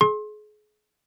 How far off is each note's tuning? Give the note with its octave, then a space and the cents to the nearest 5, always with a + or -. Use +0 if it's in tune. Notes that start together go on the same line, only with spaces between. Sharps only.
G#4 +35 C6 +25